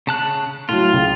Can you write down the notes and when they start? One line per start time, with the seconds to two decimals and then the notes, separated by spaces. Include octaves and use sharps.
0.07 C#3 A5 F#6
0.69 A2 F#3 F4
0.93 C#2